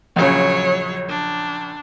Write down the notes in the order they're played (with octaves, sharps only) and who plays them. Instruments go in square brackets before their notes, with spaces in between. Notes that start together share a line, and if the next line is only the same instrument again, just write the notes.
[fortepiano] A#1 C#3 [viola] F#3 C#5
[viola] D4